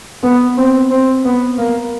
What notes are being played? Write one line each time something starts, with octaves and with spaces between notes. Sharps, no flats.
B3
C4
C4
B3
A#3